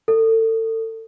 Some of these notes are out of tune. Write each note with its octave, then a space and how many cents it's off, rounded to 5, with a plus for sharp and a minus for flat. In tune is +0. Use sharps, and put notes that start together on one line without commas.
A4 +30